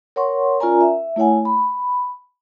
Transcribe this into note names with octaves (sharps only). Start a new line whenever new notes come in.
A#4 C#5 F#5 C6 C#6
C#4 F4 A#4 D5 G#5 A#5
E5
A3 E4 C#5 F#5 G#5
B5